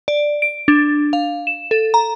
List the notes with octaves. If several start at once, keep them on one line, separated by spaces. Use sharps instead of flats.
D5
D7
D4
F5
E7
A4
A#5